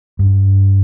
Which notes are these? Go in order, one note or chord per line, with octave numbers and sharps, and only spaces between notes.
G2